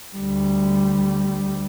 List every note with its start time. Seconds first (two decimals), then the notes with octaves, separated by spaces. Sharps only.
0.16 D2 G3